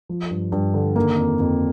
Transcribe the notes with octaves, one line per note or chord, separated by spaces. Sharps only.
F3
G2
G2
D3
D#3 A#3
F2
F2